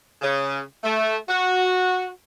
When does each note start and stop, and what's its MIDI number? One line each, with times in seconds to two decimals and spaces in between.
0.22 0.60 49
0.84 1.16 57
1.29 2.09 66